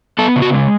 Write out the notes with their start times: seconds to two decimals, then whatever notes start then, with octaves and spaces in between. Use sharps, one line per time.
0.19 B3 A4
0.36 C#3
0.42 F#4
0.54 G#3